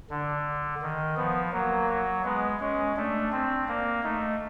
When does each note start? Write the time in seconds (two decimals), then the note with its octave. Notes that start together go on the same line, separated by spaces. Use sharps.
0.10 D3 D4
0.82 D#3
1.17 F3 B3
1.53 F#3 A#3
1.89 F#3
2.25 G#3 B3
2.61 G#3 C#4
2.97 A3 D4
3.32 C4
3.68 A#3
4.03 A3 D#4